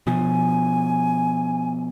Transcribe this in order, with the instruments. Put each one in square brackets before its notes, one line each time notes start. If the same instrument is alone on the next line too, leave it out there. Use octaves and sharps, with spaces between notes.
[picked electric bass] B2 F3 [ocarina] G#5